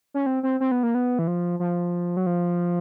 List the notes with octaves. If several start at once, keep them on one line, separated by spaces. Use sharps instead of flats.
C#4
C4
C4
C4
B3
A#3
B3
E3
F3
F3
F#3
F3